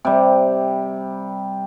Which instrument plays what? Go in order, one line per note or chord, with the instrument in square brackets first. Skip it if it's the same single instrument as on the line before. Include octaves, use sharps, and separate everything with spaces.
[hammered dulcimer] C3 G3